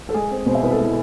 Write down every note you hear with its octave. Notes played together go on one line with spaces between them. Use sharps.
A4
G#3 G#4
C4
B2 C5
E5
C2 B4
A4
G#3 E4